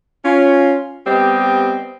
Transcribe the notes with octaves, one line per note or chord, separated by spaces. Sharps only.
C#4 F4
G3 B3 C4 G4 D#5